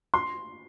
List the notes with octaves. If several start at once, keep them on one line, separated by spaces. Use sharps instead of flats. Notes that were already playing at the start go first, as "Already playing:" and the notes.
C6